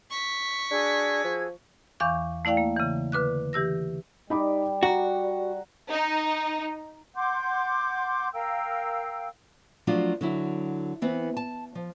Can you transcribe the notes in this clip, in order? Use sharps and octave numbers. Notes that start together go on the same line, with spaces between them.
C#6 B6
D4 F#4 G#4 E6 G#6
F3
E2 E3 F5 C#6 D6 G6
A3 E4 D5 F5 G5
A#3
C#3 E3
D3 B4 D6 F#6
E3 G4 E6 A#6
G3 D#4 B5 D6
F#4 F#5 A#5
D#4
F#5 C6 D6 G6
A#4 F5 G5 E6
F3 F#3 A3 D4 F4
D3 F#3 E4
E3 B3 C4
A5
F3